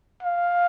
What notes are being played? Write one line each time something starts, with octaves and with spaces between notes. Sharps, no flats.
F5